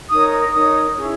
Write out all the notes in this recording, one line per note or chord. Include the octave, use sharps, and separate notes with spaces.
D#4 A#4 C#5 D#6
D#4 A#4 C#5 D#6
C#4 E4 G#4 C#5